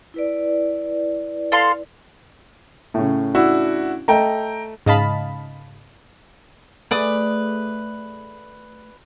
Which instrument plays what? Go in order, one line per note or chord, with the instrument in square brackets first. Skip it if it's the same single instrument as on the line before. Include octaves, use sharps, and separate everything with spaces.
[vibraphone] E4 B4 D5
[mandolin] A4 F5 C6
[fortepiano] A2 C#3
[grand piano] D4 E4 F#4
[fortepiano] A3 D#5 [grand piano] G5 A#5
[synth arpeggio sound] G#2 C#3 D#5 F5 A5 B5
[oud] A3 G#4 [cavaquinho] B4 D5 D#6